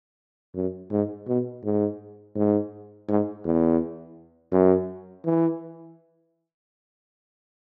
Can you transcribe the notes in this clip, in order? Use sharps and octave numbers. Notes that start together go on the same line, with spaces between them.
F#2
G#2
B2
G#2
G#2
G#2
E2
F#2
E3